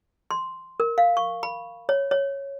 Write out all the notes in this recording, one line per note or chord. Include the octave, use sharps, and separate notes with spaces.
C6
A#4
F5
C#6
B5
C#5
C#5